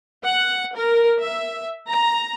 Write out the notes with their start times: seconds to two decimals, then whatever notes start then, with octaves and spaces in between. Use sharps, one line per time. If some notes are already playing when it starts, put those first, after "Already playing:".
0.24 F#5
0.75 A#4
1.20 E5
1.89 A#5